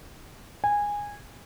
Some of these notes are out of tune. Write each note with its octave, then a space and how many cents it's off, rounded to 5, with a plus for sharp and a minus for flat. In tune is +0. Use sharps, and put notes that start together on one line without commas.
G#5 -15